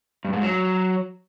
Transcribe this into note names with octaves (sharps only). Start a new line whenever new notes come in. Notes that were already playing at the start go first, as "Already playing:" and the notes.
G2
G#2
F#3